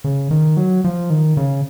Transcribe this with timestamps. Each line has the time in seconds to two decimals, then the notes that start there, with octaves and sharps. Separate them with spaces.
0.04 C#3
0.31 D#3
0.57 F#3
0.84 F3
1.10 D#3
1.37 C#3